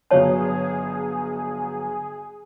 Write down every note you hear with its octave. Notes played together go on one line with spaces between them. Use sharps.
G1 F#3 G#4 C#5 F5 A5